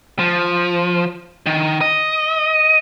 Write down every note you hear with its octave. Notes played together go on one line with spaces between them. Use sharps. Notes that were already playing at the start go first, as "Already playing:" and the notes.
F3
D#3
D#5